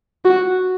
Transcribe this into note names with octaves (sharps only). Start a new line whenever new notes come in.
F#4